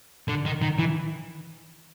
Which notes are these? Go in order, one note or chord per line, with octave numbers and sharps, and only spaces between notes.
D3
D#3
D#3
E3